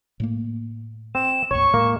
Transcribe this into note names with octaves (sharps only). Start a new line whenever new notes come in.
A2 A3 A#3
C4 E7
A1 D#2 C#5 C#6
A2 G#3 A#3